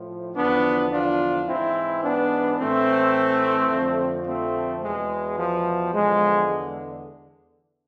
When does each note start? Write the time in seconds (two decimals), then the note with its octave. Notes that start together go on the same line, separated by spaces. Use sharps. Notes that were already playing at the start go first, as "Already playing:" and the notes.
Already playing: A2 F3
0.35 E2 D3 F3 B3 D4
0.91 D4 F4
1.47 G#2 E3 C4 E4
2.03 B3 D4
2.58 A2 E3 A3 C4
3.71 F2 D3 F3
4.27 A3 C4
4.82 E2 B2 G#3
5.39 F3
5.94 E2 D3 F3 G#3